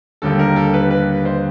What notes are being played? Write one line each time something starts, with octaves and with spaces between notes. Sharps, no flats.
D#2 D3 G3 A#3 A4
A#4
A4
B4
B4
C5